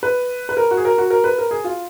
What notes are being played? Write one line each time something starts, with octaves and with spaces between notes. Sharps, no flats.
B4
B4
A#4
F#4
G#4
A#4
F#4
A#4
B4
A#4
G#4
F4